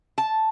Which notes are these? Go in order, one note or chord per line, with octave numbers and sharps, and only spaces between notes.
A5